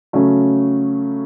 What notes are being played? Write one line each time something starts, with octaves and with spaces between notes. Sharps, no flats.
C#3 F#3 A3 C#4